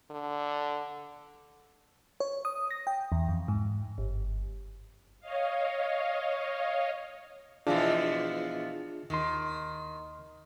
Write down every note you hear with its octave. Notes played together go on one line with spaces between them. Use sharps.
D3
C#5
D#6
A#6
G5
E2
F2
G#2
G1
C#5 D#5 F5
B2 E3 F3 D4 F4 G#4
D#2 D#3 C6